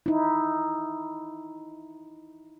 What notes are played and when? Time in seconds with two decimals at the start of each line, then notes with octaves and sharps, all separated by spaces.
0.06 D#4 E4